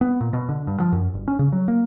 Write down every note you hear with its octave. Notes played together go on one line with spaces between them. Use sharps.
B3
A#2
B2
D3
G2
F3
F#2
G1
C#4
C#3
F#3
A#3